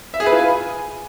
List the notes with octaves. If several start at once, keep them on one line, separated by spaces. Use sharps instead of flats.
E5
G#4
B4
F4
G#5